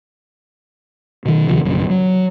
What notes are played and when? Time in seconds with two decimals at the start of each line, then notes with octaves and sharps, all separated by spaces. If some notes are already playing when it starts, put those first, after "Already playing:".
1.25 B2 D#3
1.49 D#2 C3 D#3 F3
1.65 A#1 F#2 C#3
1.90 F#3